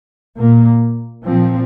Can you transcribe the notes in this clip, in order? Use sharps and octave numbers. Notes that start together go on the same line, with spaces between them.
A#2 A#3
A#2 F3 C4